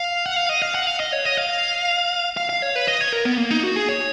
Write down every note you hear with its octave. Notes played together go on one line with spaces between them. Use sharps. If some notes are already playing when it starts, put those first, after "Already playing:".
Already playing: F5
F#5
F5
D#5
F5
F#5
F5
D#5
C#5
D#5
F5
F5
F5
C#5
B4
D#5
C#5
A#4
B3
A#3
D#4
F#4
G#4
C#5